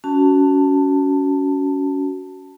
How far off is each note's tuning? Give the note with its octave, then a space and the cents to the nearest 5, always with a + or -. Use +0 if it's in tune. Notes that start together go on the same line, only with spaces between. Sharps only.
C#4 +25 F#4 +10 A5 +10